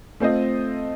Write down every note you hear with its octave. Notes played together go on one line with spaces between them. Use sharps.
A3 C4 F4 C5 D#5